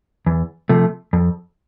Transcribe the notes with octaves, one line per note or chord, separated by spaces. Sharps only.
E2
C3 F3 A3
F2